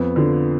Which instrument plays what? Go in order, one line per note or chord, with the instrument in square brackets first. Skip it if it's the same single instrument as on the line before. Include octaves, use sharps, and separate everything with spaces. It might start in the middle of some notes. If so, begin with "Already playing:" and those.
Already playing: [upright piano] F2 B3
D3 F3